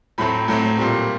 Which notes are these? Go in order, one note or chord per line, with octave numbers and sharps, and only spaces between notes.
A2 F#3 A3 C4 B5
A2 F#3 A3 C4
A#2 G3 C4